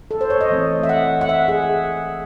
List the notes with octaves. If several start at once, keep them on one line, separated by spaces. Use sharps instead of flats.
A4
C5
C#5
D#5
E3 A3 C4
E5
F#5
F#5
E5
G#4